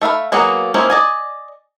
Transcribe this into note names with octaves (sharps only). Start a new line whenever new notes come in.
A3 E5 F5 B5
F#3 A#3 B3 F#4 G#4
G#3 A#3 C4 C#4 E4
D5 D#5 G#5